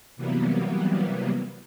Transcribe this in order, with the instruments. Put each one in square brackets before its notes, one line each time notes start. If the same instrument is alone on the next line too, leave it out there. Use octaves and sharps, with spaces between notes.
[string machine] C3 E3 F#3 G3 A#3 B3